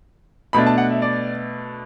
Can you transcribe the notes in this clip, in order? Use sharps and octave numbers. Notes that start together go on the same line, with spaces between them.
B2 A3 D4 B5
A5
F#5
E5
D5